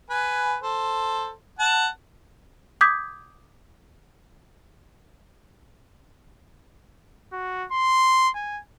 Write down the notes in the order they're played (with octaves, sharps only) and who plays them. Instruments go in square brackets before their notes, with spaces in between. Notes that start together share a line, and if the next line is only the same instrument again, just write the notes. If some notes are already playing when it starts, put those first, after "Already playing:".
[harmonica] B4 G#5
A4 C5
F#5 A5
[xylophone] D6 D#6 G6 G#6 B6
[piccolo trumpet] F#4
C6
G#5